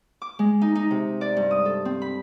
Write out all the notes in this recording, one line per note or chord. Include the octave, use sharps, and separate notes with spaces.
D6
G#3
D#4
D#4
C3
D5
G2
D#6
A4
C4
B5